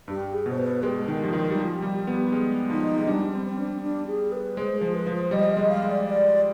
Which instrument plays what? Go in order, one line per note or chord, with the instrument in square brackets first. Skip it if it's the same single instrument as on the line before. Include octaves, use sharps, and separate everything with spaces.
[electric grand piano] G2 [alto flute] G4
[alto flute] G#4
[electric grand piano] B2
[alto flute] C5
B4
[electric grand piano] G#3 [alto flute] G4
[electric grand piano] D#3
F3
D#3
G3
F3
G3
B3
G#3
[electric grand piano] F3 [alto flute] D#4
[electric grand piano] G#3
[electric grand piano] G3 [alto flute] D4
[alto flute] C4
C4
D4
D4
G#4
B4
[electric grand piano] G#3 [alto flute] C5
[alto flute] G#4
[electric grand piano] F3
[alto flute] B4
[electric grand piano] F3
[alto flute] C5
[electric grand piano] G3 [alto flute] D#5
[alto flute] D#5
[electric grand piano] G#3
[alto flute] F5
[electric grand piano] G#3
[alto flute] D5
D5